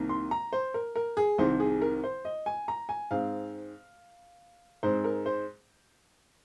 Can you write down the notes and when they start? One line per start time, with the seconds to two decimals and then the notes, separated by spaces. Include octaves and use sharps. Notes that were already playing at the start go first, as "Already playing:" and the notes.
Already playing: C2 C3 D#3 A#3
0.09 C6
0.31 A#5
0.53 C5
0.74 A#4
0.96 A#4
1.17 G#4
1.38 C2 C3 D#3 C5
1.60 G#4
1.81 A#4
2.04 C5
2.25 D#5
2.46 G#5
2.68 A#5
2.89 G#5
3.11 G#2 G#3 C4 F5
4.83 G#2 G#3 C4 C5
5.04 A#4
5.26 C5